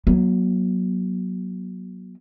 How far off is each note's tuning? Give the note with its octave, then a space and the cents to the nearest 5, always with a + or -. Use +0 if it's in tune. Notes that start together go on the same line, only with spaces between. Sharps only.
F#3 +0 A#3 +45